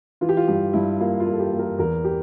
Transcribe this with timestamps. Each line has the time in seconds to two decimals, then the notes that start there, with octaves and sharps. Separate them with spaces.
0.21 E3 F4
0.29 G4
0.37 F4
0.48 G2 G4
0.73 G2 E4
1.00 A#3 F4
1.20 F4
1.26 A#3
1.33 A4
1.40 G4
1.53 A#3
1.59 A#4
1.78 E2 A#4
2.04 G4